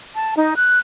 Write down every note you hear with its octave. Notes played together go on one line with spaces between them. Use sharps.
A5
D#4
F#6